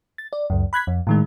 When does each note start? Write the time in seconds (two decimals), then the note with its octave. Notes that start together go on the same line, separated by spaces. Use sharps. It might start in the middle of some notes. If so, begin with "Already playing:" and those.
0.18 A6
0.33 D5
0.50 C#2 F#2
0.73 B5 F#6 G#6 B6
0.87 F2
1.07 A2 D#3 G#3